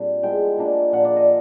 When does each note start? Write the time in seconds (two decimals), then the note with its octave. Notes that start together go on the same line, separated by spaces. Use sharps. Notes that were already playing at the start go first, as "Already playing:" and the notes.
Already playing: A#2 G3 C4 D4
0.23 F3 G#3 B3 E4 G5
0.58 F3 A#3 D4
0.92 A#2 F3 A#3 F#5
1.05 D5
1.16 D#5